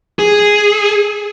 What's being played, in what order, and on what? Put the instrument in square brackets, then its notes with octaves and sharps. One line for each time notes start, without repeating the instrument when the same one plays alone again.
[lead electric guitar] G#4